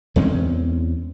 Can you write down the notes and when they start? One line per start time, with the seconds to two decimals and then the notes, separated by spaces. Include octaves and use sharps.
0.16 E2 G#3 C4 C#4